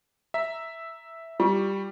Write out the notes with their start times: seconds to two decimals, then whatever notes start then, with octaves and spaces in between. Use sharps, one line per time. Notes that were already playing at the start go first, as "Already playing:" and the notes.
0.34 E5 A#5 B6
1.40 G3 F4 C#6